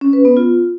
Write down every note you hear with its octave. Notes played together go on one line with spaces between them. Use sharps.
C#4
B4
B3
F4